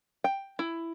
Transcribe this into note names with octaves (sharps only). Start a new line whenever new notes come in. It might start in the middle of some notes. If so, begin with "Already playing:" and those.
G5
E4